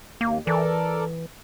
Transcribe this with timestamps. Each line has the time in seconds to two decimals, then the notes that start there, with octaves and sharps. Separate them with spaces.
0.21 D#2 A#3
0.47 E3 A4 A#4 D5